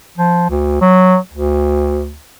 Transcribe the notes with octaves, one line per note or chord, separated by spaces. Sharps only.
F3
D2
F#3
D2